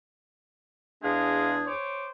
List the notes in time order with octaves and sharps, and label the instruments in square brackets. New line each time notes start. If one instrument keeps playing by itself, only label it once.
[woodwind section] E2 D4 G#4 [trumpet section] G#3 F5
[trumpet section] C5 C#5 D6